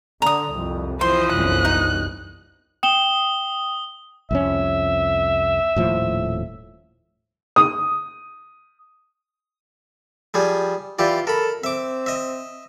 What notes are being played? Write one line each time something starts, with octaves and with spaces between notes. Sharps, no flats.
D3 A#5 D#6
C2 F2
E3 F3 C5 D#5 C6
G1 C2 F#2 F#6
D#4
G5 D#6 E7 G7
C2 F2 C#4 E5
D#1 A2 F3
D#6
F3 G3 G#4
E3 F4 G4 D5
A4 A#4 B5
C4 E5 D6
D#5 E5